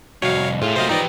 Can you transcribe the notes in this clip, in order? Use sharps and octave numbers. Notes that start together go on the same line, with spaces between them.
C2 F2 F#4 C#5 F5
A2 A3 F4 G#4
C3 F#3 A#3 C5 D#5 F5
E3 F3 D#4 F4 G4 B4 D5 D#5